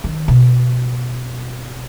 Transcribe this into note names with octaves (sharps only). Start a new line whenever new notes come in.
D#3
B2